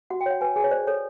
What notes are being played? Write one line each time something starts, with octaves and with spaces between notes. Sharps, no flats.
F#4 F#5
G5
C#5 F#5
B4 G#5
G#4 G#5
C#5
C5 D5
A4 C#5